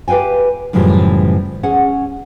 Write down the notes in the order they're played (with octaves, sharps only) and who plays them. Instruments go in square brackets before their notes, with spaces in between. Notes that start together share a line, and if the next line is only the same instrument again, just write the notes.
[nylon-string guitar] G4 B4 F5 G5 G#5
F#2 A2 C#3 E3 F3 G3
C#4 G#4 F#5